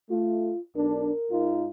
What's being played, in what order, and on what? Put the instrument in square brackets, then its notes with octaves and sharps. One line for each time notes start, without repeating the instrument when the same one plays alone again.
[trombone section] A3 [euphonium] F4
[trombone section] B1 D4 [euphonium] A#4
[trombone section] G#2 D#4 F4